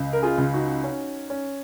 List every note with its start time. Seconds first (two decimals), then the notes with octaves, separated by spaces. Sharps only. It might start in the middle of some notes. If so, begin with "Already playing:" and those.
Already playing: C#2
0.13 A#4
0.23 F4 G#4
0.38 C#2
0.54 D#4 F#4
0.84 C#4
1.30 C#4